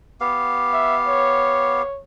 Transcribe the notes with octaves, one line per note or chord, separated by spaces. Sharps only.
B3 G4 F5
E5
C#5